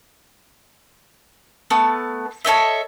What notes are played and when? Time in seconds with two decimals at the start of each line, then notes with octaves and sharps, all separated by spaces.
1.70 A3 B3 A5
2.45 A4 C#5 D#5 E5